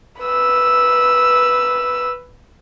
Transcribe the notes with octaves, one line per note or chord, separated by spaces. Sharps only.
B4 E6